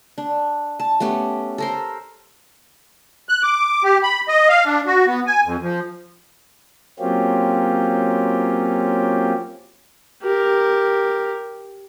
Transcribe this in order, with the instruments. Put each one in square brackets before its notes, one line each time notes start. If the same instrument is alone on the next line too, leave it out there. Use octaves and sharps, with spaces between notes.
[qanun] D4
A5
A3 B3 C#4 G4
A4 A#4 C5
[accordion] F#6
D6
G4
B5
D#5
F5
D4
F#4
B3
G#5
F2
F3
[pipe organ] F#3 A#3 C4 C#4 F4 G4
[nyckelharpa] G4 A#4